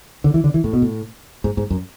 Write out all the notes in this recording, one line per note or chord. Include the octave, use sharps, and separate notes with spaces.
D3
E3
D3
E3
A2
B2
A2
G#2
G#2
F#2